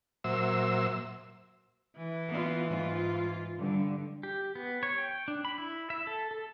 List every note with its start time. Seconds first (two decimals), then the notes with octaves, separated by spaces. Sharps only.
0.24 A#2 F#3 C5 E5 E6
1.97 E3
2.29 B3 F4
2.70 G#2 F4
3.59 G2 D3
4.23 G4
4.55 B3
4.83 C#5
4.98 G5
5.28 D4
5.45 B5
5.58 E4
5.90 E5
6.07 A4
6.31 A4